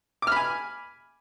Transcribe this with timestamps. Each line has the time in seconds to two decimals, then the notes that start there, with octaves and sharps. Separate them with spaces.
0.22 D6
0.27 F6
0.32 B5
0.36 G#5